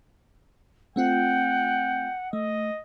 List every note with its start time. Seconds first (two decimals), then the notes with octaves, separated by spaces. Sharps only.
0.96 A3 C4 F4 F#5 G5
2.33 A3 D#5